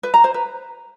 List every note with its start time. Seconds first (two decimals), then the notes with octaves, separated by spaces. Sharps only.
0.03 B4
0.14 A#5
0.24 C5
0.34 B4